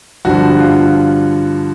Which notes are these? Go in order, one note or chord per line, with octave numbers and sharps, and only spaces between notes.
G2 D3 F3 F#4
F4